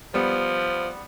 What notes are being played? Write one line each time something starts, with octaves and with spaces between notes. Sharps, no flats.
F3 G3 B3